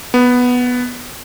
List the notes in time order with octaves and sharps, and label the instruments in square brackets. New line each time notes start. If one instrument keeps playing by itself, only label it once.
[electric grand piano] B3